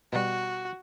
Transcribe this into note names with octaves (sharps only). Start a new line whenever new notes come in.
B2 G3 F#4